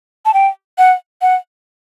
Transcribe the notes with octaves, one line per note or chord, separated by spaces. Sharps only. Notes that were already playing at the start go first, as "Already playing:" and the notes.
A5
G5
F#5
F#5